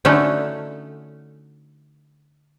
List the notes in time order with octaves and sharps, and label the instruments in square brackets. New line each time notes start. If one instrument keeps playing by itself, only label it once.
[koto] D3 A3 C#4 D#4 F#4 A4